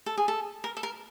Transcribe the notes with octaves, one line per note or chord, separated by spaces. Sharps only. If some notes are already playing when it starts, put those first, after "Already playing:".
A4
G#4
A4
A#4
A4
A#4